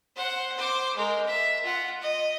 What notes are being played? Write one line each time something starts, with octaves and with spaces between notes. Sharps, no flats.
C5 F#5
C5 D6
G#3 A#4
E5
F4 F#5
D#5